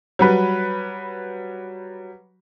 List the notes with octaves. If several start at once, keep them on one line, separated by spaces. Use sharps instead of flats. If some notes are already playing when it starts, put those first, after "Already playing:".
F#3 G3 B4